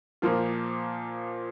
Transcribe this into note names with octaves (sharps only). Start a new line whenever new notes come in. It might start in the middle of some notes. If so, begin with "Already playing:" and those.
A#2 F3 A#3 F4